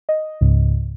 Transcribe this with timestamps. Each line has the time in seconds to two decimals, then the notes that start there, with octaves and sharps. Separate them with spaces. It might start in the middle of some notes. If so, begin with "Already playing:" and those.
0.09 D#5
0.41 C#2 G#2 C#3